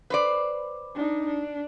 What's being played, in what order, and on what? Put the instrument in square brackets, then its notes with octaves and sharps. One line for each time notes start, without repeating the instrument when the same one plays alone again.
[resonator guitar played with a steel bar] B4 C5 D5
[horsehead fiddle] D4 D#4
D4